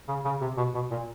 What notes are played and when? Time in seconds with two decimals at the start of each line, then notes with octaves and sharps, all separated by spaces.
0.08 C#3
0.25 C#3
0.41 C3
0.57 B2
0.75 B2
0.91 A#2